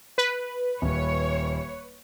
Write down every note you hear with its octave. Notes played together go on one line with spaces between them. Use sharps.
B4
D#1 C#5